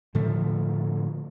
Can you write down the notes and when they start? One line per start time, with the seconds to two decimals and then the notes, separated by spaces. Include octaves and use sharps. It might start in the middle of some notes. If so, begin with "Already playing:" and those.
0.15 A2 D3 F3 A3